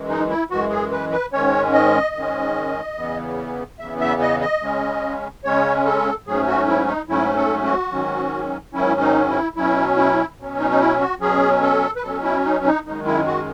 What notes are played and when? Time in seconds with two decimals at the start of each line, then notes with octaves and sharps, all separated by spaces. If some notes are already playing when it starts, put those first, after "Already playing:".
Already playing: F#2 E3 G#3
0.09 D#4
0.30 E4
0.50 F#2 E3 G#3 F#4
0.70 G#4
0.91 B4
1.12 B4
1.33 G#2 D#3 G#3 C#4 C#5
1.73 D#5
2.15 G#2 D#3 G#3 C#4
2.97 E2 C#3 E3 B3
3.79 E2 C#3 E3 B3 E5
4.00 E5
4.21 D#5
4.41 D#5
4.62 C#3 G#3 C#4
5.44 C#3 G#3 C#4 C#5
5.86 A4
6.27 G#2 F#3 A3 C#4 G#4
6.47 F#4
6.68 E4
6.88 D#4
7.09 G#2 F#3 A3 C#4 E4
7.36 A4
7.64 F#4
7.91 G#2 D#3 F#3 C#4
8.73 G#2 D#3 F#3 C#4 E4
9.01 D#4
9.29 E4
9.56 B2 F#3 C#4 E4
9.97 E4
10.38 B2 F#3 C#4
10.59 D#4
10.71 D#4
10.80 E4
11.00 F#4
11.20 B2 F#3 C#4 G#4
11.62 A4
11.96 B4
12.03 B2 F#3 C#4 A4
12.23 E4
12.45 D#4
12.65 D#4
12.85 F#2 D#3 G#3 D#4
13.06 E4
13.26 F#4